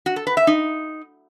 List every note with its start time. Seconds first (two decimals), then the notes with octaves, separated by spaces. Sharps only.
0.06 F#4
0.16 A4
0.27 B4
0.37 E5
0.47 D#4